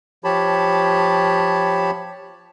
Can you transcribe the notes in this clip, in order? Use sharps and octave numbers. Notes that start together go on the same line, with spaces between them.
F3 G4 C#5 A5 B5